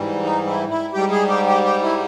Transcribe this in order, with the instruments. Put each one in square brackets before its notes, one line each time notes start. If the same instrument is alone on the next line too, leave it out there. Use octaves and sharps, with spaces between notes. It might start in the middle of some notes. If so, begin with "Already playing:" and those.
Already playing: [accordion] G#2 E3 G3
D#4
E4
E4
G#2 G3 G4
G#4
G4
G4
G4
E4